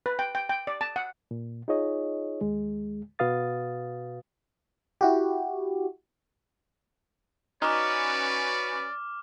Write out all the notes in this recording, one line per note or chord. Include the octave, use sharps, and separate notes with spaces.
B4
G5
G5
G5
D5
A5
F#5
A#2
D#4 F4 G#4 C#5 D#5
D#2 G#3
B2 F#4 B4 F5 D#6 A6
E4 F#4 G4
C#4 D#4 F#4 B4 D5 D6 F6